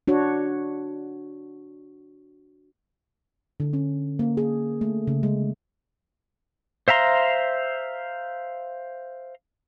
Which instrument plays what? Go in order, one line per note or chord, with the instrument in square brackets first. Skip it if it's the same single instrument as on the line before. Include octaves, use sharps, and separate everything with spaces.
[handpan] D4 F#4 C#5
D3
C#4
A#3
G#4
A3
C#3
G#3
[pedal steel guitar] C5 E5 F5 A#5 C6